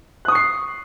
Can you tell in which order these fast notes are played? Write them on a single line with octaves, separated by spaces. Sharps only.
F#6 D#6 C#6 C7